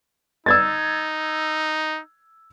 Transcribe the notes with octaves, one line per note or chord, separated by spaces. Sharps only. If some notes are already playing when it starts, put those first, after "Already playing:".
D#4 E6 G#6 A6